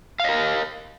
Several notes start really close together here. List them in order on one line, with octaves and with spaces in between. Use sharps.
F5 D#5 A#4